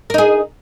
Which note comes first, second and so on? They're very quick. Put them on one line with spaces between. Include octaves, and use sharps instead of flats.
A#4 D#4 G#4